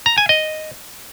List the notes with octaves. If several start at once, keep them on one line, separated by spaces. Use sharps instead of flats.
A#5
G#5
D#5